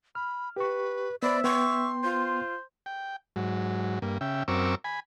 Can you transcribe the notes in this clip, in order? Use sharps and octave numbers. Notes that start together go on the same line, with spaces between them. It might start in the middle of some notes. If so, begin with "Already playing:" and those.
B5 F6
G4 B4 C#6
B3 C5 D5 E5 B5
B3 G5 C6 C#6 G6
F4 C5
G5
G#2 F#3
G2 A#3
C#3 E5 G5
F#2 C4 A#4 C#6 D6 E6
G#5 B5